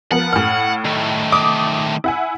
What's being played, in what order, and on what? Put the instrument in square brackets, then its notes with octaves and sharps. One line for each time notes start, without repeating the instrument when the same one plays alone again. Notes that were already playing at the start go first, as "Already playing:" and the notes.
[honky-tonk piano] F3 B3 A#4 [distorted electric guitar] F#5
[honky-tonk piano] A2 F6
[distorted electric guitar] D#3 A3
[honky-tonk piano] D6 D#6 D7
E4 F#5 G#5